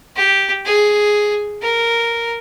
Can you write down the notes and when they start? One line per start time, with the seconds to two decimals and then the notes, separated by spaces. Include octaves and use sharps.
0.16 G4
0.65 G#4
1.62 A#4